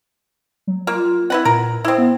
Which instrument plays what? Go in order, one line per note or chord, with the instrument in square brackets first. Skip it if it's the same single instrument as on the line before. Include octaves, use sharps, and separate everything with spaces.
[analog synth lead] F#3
[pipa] A#3 [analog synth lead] F4
[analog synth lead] C4 [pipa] E4 B4 F#5
[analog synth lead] A#2 [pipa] A#4
[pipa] C4 E4 [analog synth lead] D#6
[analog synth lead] B3